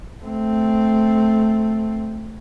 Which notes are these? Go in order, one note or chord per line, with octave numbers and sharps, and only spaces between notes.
A3 C4